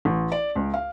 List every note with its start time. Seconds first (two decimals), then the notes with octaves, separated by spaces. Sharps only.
0.05 A1
0.32 D5
0.56 C#2
0.74 F5